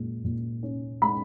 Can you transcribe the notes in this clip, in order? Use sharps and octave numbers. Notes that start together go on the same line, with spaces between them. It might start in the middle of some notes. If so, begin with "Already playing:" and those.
Already playing: A#2 G#3
A#2
C#4
G#3 B5